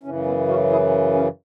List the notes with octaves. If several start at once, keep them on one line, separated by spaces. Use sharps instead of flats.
F#2 C#3 E3 C#4
B3 E4
C#4 F#4
E4 G#4
C#4